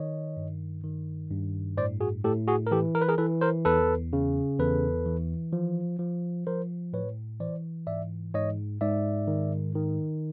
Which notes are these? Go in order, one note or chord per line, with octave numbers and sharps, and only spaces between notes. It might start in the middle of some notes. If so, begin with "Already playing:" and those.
Already playing: D#3 C#5 D#5
G2
D#3
G2
A2 C5 D5
F#4 G#4
A2 G4 A4
F#4 G#4
A#4
E3 G4 A4
A#4
B4
G#4 A#4
E3 A4 B4
A#4 C5
E2 A4 B4
C#3
E2 A4 B4
E3
F3
F3
F3 A#4 C5
A2 B4 C#5
E3 C5 D5
G#2 D5 E5
G#2 C#5 D#5
G#2 D5 E5
D#3
D#3